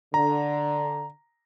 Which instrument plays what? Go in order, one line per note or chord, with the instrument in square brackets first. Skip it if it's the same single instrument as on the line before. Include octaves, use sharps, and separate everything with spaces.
[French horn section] D3 [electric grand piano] A#5